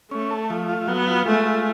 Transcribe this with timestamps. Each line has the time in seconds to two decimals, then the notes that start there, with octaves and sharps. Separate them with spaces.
0.11 A3 C#4
0.31 A4
0.50 F3
0.69 F4
0.87 F#3 B3
1.07 F4
1.26 G#3 A3
1.46 F4